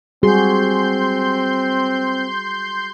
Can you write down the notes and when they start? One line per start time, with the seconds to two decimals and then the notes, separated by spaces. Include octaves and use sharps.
0.23 G3 C4 F#4 G#4 C6 G6